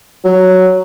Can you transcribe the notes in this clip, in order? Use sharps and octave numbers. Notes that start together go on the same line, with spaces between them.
F#3